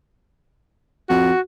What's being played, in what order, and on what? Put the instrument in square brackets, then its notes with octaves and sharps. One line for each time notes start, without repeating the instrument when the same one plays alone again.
[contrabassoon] F2 [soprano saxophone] F#4